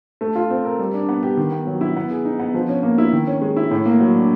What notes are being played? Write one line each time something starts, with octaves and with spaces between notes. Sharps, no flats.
A3
F4
C4
A#4
G3
D4
B3
G4
D#3
B3
F#3
E4
B3
G#4
D#4
B3
F3
C#4
A#3
E4
D#3
C#4
G#3
E4
A2
A#3
F#3
D4